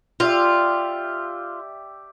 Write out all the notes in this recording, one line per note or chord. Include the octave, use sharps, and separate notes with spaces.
F4 G4 D5 E5